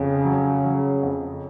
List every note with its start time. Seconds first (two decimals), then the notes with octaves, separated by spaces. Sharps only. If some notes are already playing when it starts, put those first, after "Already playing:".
Already playing: F2 C#3
0.25 F#3
0.64 F#3
1.03 F2